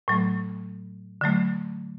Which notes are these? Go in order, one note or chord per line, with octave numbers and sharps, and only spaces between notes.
A2 F#3 A3
D3 F#3 A3